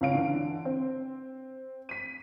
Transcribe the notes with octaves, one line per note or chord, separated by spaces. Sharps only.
C#2 C#4 F5 D7
D3 E3
C4
B6 D#7